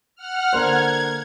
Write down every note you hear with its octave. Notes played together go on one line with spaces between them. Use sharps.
F#5 F6
D3 A#3 C5 G#6